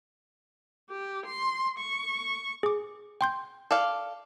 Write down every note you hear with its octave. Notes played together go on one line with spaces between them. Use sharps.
G4
C6
C#6
G#4 D6
G5 C6 G6
A4 D5 F5